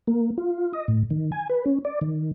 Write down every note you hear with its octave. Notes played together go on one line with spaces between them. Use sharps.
A#3
F4
D#5
A2
D#3
G#5
B4
C#4
D5
D#3